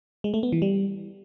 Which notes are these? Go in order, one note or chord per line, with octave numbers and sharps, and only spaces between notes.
G#3
A3
B3
E3
G3